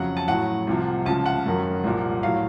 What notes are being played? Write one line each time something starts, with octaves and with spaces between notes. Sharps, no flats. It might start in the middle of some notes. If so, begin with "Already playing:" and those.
Already playing: F2 C#3 F#3 F#5
A5
A2 F#3 F#5
C2 C3 F3
C#2 C#3 F3 A5
F#5
F#2 D#3 F#3
C2 A#2 F3
A2 F#3 F5